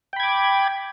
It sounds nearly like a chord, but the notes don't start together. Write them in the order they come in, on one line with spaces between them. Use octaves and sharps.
G5 B5 G#6 D6